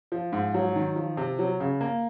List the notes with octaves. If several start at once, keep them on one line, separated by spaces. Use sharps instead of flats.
F3
G#2
F#3
D#3
F3
C3
F#3
C#3
A#3